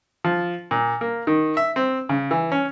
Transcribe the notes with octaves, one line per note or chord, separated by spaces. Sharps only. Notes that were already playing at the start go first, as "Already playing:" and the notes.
F3
A#2
A#3
D#3
E5
C4
C#3
E3
C#4